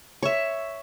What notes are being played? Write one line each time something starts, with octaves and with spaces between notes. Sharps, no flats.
C#5 E5